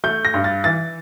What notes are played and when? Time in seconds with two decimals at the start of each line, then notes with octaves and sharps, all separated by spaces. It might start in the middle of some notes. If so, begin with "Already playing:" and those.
0.04 A3 G6
0.25 A#6
0.34 G2
0.44 A6
0.64 E3 A6